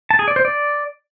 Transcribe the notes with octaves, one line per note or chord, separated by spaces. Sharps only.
A5
G#4
D5
C5
D5